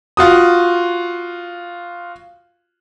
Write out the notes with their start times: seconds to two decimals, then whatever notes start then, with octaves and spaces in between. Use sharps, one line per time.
0.17 F4 F#4 D#6